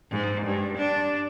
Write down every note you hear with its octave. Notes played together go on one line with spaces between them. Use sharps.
G#2
G2
D4